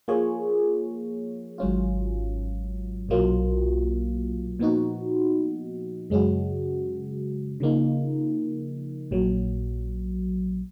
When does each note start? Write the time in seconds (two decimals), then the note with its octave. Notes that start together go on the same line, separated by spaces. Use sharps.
0.08 F3 A#3 F4 G#4 C#5
1.58 G#1 G#2 F#3 C#4 F4
3.09 B1 A#2 F#3 A#3 F4
4.59 A#2 F3 B3 D#4 F#4
6.10 F#2 C#3 G#3 C#4 F#4
7.60 C#3 F3 A#3 D#4
9.11 A#1 A#2 F#3